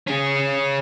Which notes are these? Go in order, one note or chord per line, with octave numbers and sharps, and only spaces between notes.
C#4 G#4